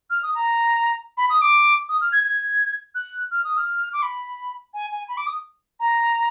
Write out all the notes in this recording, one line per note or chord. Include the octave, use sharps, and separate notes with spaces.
F6
D#6
A#5
B5
D#6
D6
D#6
F6
G#6
G#6
F#6
F6
D#6
F6
D6
B5
G#5
G#5
B5
D6
D#6
A#5